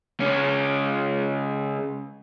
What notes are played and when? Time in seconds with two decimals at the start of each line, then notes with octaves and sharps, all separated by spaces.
0.20 C#2 C#4